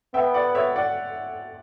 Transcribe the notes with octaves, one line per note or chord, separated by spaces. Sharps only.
B3 E5 G5
D5 F#5
C#5 E5
D5 F#5